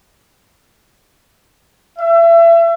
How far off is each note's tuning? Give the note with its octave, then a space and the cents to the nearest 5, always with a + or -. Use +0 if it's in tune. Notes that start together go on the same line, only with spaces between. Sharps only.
E5 +30